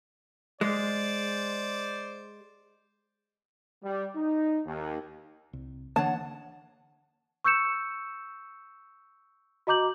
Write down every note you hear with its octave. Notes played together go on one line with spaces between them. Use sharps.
G#3 C5 D5
G3
D#4
D#2
C2
D3 E3 A#3 D4 C#5 F#5 A5
C#6 E6 G6 C#7 E7
F#4 D#5 A#5 D6 G6 F#7